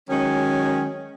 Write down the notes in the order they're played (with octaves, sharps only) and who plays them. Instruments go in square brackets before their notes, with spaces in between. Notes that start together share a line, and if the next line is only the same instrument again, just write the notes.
[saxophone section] D#3 F#3 G#3 C#4